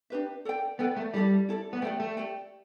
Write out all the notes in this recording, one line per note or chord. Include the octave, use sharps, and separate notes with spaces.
D4 G4 B4 E5
A4 D5 G5
B3 A4 D5 G5
A3
G3 E4 A4 D5
E4 A4 D5
B3
A3 G4 D5 G5
A3
G4 D5 G5